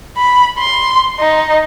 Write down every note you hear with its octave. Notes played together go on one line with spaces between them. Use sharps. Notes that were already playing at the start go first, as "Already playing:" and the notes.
B5
C6
D#4